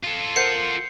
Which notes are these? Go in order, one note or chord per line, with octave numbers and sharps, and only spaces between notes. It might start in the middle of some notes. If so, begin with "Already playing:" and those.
F4 A4
A#4 C5 F#5 G6 C7 C#7